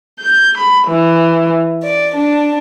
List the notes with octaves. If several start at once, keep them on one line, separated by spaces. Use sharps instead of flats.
G6
B5
E3
D5
D4